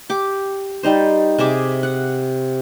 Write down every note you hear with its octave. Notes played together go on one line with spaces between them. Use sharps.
G4 D6
G3 D#4 C5
C3 G#4 E5 D6
F#5